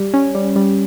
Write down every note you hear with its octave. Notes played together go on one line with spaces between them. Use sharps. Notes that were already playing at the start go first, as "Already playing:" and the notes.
Already playing: G3
C#4
G3
G3